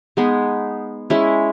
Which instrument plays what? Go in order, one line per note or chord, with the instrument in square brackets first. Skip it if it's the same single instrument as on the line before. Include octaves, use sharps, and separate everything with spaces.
[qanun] G#3 B3 D#4 G#4
G#3 C#4 E4